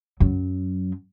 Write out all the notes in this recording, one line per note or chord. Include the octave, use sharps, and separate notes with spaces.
F#2 F#3